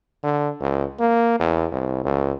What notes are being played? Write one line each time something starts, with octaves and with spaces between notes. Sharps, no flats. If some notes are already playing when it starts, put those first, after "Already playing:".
D3
C#2
A#3
E2
C2
C#2